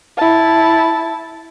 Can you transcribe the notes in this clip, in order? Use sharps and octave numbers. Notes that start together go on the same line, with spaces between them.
E4 A5